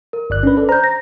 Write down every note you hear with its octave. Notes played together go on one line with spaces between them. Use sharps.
A#4
G1 D5 F#6
C#4 D4 B4
A4 D5
C5 A#5 G6
A#6